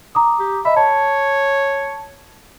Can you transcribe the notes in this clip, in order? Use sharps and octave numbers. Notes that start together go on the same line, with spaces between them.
A#5 D6 D#6
G4
D#5 E5 B5
C#5 A5